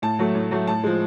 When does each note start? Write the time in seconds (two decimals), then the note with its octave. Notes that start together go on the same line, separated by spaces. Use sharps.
0.02 A2 A5
0.19 F#3 A3
0.35 A2
0.51 F#3 A3
0.67 A2 A5
0.84 F3 G#3